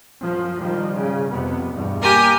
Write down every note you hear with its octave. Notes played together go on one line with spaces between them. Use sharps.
F#2 F3
D#3 F3 G3
G#2 C#3
F2 C3 B3
E2 G2 B2
A#3 G4 A#4 G#5